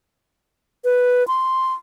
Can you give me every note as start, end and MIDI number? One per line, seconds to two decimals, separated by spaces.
0.85 1.26 71
1.28 1.73 84